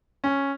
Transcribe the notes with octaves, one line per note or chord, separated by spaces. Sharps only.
C#4